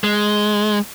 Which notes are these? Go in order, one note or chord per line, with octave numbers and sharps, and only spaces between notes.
G#3